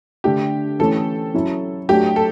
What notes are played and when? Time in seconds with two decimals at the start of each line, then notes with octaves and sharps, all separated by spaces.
0.24 D3 A3 D4 G4
0.79 E3 A3 C#4 A4
1.34 F#3 C#4 E4
1.89 F#3 A3 D4 F#4 G4
2.16 A4